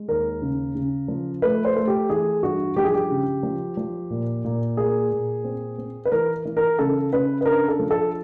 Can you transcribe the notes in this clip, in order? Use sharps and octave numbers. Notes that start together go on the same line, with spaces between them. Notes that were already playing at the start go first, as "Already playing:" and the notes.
Already playing: G#3
D#2 A#4
C#3
C#3
F3
A3 B4
C5
A3
G4
E3 G#4
G2 F#4
F3 G4
G#4
G4
C#3
F3
F3
A#2
A#2
A#3 G#4
A#2
C4
C4
B4
E3 A#4
E3
A#4
C#3 A4
C#3 B4
B4
D4 A#4
A4
F3
A4